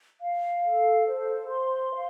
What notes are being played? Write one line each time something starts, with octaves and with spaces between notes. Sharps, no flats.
F5
A4
C5
C6
F5